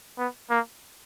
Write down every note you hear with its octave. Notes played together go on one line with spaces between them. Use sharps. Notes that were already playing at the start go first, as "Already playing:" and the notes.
B3
A#3